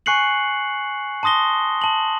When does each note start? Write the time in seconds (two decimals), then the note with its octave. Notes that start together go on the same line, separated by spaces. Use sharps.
0.06 G#5 C#6 F#6 C7 C#7 F#7
1.23 A5 C6 D#6 A#6 G7
1.81 A5 F#7